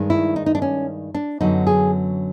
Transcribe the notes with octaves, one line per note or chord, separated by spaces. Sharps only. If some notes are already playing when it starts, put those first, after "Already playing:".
Already playing: G2 D#3 G#3
E4
D#4
D#4
D4
C#4
D4
F#2 D3 F#3 B3 D#4
G#4